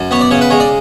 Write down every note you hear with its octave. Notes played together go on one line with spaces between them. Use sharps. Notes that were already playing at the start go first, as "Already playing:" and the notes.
Already playing: F#2
B3 C#5
D5
C#3 C#5
B4
G#3 C#5
D5